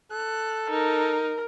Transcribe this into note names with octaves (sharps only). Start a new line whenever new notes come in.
A4 F#6
D#4 A#4